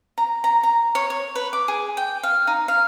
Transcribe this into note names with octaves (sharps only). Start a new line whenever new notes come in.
A#5
A#5
A#5
C#5
C#5
B4
D6
G#4
G5
F5
D#4
F5